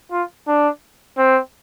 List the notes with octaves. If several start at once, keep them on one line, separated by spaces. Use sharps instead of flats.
F4
D4
C4